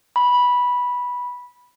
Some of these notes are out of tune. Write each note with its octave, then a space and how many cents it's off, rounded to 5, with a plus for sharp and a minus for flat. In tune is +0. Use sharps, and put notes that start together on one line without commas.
B5 -10